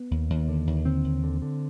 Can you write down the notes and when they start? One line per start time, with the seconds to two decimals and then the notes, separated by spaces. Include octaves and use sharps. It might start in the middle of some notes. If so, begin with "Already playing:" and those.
Already playing: B3
0.11 D#2
0.30 D#2
0.48 D3
0.67 D#2
0.85 D3 C4
1.04 D#2
1.24 D3
1.42 D3